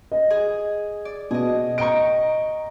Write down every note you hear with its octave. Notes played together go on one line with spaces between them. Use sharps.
D#5
G#4
D5
B2 G#4 D#5
D#5 G5 A#5 C#6 D7